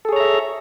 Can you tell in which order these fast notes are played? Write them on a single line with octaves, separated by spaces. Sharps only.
A4 G#4 C#5 A#5 E5